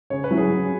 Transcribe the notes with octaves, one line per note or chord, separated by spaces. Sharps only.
C#3 C#5
B4
F#3 C#4 E4
G#4
C#3